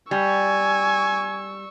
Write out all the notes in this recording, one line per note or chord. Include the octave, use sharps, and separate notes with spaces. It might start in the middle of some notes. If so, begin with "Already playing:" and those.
G3 G#5 C#6 E6